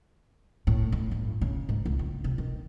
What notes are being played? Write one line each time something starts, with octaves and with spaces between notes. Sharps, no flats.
A2
A2
G1
C#3
G#2
C#2
C#2
C3
D#3